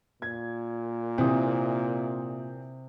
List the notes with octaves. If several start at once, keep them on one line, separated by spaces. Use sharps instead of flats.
A#2 G#6
C3 E3 C4 D#6